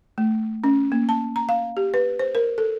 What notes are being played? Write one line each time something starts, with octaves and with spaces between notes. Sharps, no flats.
A3
C#4
A#3
A5
A#5
F5
G4
B4
C5
A#4
A4